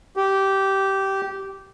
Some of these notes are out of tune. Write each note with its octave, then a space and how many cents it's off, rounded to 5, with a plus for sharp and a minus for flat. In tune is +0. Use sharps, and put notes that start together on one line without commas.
G4 -15